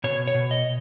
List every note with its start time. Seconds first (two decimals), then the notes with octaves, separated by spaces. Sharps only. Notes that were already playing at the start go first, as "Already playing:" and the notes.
0.04 B2 C#5
0.27 C#5
0.35 B2
0.51 D#5